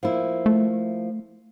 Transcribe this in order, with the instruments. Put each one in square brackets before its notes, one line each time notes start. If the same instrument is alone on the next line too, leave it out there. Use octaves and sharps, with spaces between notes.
[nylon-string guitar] F3 A#3 E4
[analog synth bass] A3